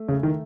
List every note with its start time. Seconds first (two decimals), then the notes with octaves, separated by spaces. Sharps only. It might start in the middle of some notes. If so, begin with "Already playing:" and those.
Already playing: A3
0.09 C#3
0.23 D#3